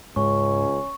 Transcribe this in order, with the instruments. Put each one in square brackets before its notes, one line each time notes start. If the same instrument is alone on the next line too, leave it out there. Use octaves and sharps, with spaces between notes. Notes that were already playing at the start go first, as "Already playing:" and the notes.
[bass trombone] C#2 [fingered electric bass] G#2 [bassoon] C#4 [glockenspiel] C#6